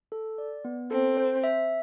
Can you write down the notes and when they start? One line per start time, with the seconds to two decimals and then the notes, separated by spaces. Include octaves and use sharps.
0.12 A4
0.38 D5
0.65 B3
0.91 C4 A4
1.17 C5
1.44 E5